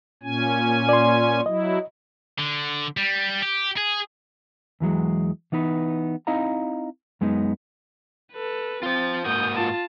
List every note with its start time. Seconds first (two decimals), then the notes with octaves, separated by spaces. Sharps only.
0.23 A#2 C#4 G#5
0.89 D5 C6
1.46 F#3 E4 D#5
2.39 D3
2.97 G3
3.43 G4
3.77 G#4
4.80 E2 E3 F#3 G#3
5.52 E3 B3 D#4 B4
6.27 C4 D#4 E4 D#5 F5 A#5
7.21 F#2 G#3 B3 D#4
8.33 A4 B4
8.83 C4 F4 C5 A6
9.25 G#2 A#3 F#4 D#6 G6
9.57 F4 A5